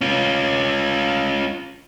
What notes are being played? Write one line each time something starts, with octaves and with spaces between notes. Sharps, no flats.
C#4 F4